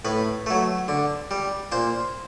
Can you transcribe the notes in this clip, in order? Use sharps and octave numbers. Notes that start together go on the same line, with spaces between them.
A2 B4
F#3 A3
D3
G3
A#2 C5